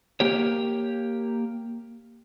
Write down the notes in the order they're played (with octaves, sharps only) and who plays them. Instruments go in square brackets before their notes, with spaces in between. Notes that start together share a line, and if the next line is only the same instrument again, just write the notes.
[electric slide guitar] A#3 G4 C#5